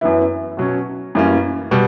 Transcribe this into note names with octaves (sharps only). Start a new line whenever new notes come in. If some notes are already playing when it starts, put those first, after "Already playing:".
F#2 E3 B3 E4
B2 F#3 C#4
F#2 E3 G3 A#3 C#4
B2 G3